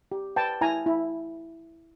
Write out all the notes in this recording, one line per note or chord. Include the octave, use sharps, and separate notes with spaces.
G4
B4 G5 A5
E4 G#5 A#5
E4